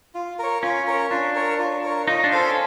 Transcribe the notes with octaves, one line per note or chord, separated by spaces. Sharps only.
F4
A#4 C#5
C#4 F4
A#4 C#5
D4 F4
A#4 C#5
F4
A#4 C#5
D#4 F4
D4
A4 C5 F5
C#4